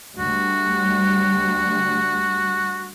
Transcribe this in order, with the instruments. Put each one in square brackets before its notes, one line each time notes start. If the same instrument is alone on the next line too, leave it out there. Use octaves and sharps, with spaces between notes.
[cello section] D2 G3 [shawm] F#4